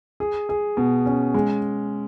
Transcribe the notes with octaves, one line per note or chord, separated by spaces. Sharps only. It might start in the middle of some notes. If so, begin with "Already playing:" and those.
G#4
G#4
B2
C#4
G#3